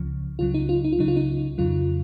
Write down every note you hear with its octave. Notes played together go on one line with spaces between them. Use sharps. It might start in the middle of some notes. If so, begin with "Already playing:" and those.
Already playing: C#2 C#3 F3
C#2 C#3 F#3 F4
D#4
F4
D#4
F4
C#2 C#3 F#3 D#4
F4
D#4
F2 C#3 F#3 F4